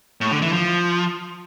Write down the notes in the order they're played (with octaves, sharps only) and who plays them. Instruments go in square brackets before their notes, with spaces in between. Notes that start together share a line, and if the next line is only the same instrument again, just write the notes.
[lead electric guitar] A2
D3
E3
F3